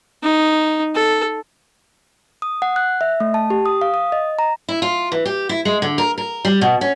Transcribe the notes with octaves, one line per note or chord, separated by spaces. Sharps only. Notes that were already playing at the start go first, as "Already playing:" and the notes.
D#4
A4
D#6
F#5
F#6
E5
A3
A5
G4
D#6
F5
D#6
D#5
A#5
E4
F4
E3
G4
E4
G#3
D3
A#4
A#4
G3
B2
C#4